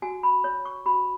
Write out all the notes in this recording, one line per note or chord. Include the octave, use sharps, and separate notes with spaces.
F#4 G#5
B5
C#5
C#6
F#4 B5